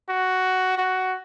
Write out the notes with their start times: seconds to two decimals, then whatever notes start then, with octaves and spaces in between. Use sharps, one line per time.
0.09 F#4
0.78 F#4